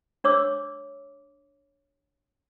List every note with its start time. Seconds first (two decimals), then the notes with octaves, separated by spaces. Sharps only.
0.24 D4 C#5 D6 E6